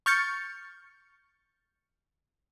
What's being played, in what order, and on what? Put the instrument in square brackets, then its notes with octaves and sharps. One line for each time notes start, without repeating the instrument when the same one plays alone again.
[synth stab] C#6 F6 G6 A6 C#7